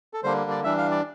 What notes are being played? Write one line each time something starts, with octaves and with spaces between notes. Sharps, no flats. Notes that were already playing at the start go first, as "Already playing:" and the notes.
A4
D3 G3 A#3 D4 C5
D5
E3 G3 D4 E5
F5
D5